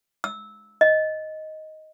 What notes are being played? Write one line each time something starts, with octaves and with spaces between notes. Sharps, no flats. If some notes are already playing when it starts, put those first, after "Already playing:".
E6
D#5